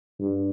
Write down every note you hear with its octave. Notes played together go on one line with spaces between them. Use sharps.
G2